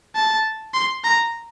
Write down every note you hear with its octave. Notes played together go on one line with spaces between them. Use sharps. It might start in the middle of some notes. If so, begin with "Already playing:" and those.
A5
C6
A#5